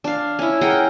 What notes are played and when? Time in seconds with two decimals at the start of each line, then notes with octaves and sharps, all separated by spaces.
0.04 D4 F5
0.39 C#4 E4
0.61 G#4 A#4 F#5 G5